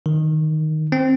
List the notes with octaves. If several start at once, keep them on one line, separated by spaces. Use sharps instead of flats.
D#3
C4